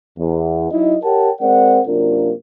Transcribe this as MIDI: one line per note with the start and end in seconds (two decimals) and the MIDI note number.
0.19 0.71 40
0.71 0.96 54
0.71 0.96 63
0.71 0.96 64
0.71 0.96 75
1.03 1.30 67
1.03 1.30 70
1.03 1.30 73
1.03 1.30 78
1.03 1.30 79
1.03 1.30 81
1.41 1.80 56
1.41 1.80 60
1.41 1.80 70
1.41 1.80 74
1.41 1.80 78
1.87 2.33 42
1.87 2.33 48
1.87 2.33 58
1.87 2.33 62
1.87 2.33 65
1.87 2.33 70